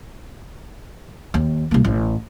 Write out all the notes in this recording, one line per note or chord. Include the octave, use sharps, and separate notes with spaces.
D#2
C2 A#3
A1